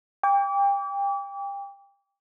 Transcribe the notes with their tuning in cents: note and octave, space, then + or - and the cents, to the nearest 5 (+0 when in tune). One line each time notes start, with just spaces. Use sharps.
G5 +30 D6 -35